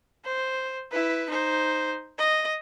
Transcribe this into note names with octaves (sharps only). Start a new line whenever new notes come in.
C5
E4 B4
D#4 C5
D#5